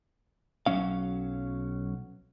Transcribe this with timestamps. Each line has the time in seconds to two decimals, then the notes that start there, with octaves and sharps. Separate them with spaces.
0.66 B1 G#2 F#3 C#4 F5